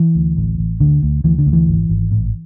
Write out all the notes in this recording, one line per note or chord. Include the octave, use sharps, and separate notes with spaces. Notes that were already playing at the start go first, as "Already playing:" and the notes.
Already playing: E3
D2
A1
A1
D2 D3
D2
D2 E3
D3
D2
E3
G#1
G#1
A1